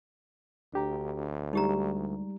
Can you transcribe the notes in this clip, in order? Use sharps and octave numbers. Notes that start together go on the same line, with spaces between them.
D2 D4 G4 A#5
G3 G#3 D#4 G4 A#5